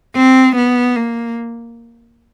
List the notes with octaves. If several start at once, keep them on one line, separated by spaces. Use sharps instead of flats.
C4
B3
A#3